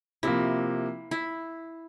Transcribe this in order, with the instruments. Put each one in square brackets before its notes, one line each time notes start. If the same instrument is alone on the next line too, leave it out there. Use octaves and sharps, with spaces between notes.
[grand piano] C3 F3 A#3 [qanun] E4
[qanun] E4